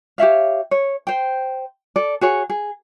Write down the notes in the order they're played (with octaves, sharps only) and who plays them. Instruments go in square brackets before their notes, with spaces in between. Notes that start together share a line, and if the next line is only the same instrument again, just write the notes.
[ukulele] G4 C#5 E5 F5
C#5
C5 G5
A4 D5
F#4 G#4 C#5
G#4